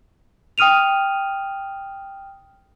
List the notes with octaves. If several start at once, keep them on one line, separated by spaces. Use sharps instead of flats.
G5 D#6 F6 D#7 F7